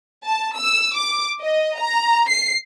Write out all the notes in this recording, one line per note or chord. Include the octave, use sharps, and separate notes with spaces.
A5
E6
D6
D#5
A#5
C7